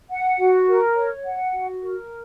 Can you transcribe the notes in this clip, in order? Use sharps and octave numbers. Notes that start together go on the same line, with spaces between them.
F#5
F#4
A#4
C#5
F#5
F#4
A#4